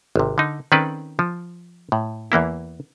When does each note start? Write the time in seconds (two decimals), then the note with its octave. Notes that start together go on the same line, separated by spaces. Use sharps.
0.16 G#1 C3
0.38 D3 D#4
0.72 D#3 C4 C#4 A4 B4 D5
1.19 F3
1.92 A2
2.32 E2 E3 A#3 E4